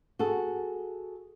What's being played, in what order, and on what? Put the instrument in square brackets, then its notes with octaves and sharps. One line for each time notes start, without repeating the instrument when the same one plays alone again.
[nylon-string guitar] F#4 G#4 A4